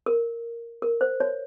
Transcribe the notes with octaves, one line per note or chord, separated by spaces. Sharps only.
A#4
A#4
C5
C#5